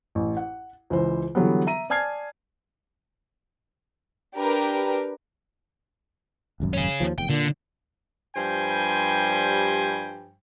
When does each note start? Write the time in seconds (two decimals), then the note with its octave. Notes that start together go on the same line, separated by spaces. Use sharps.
0.15 A1
0.37 F#5
0.90 C#2 E3 C5
1.35 D3 E3 F#3 G3 B3
1.67 E5 A#5 D#7
1.90 D5 G#5 A5 F6 G#6 C7
4.37 D4 G4 A#4 B4
6.60 D#1 G#1 F#2
6.73 C#4 G#4
7.00 D#2 F3
7.18 F1 E2 G5
7.30 A#2 D3
8.35 G2 F3 G3 C5 G5 G#5